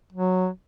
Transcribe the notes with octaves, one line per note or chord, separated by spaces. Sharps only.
F#3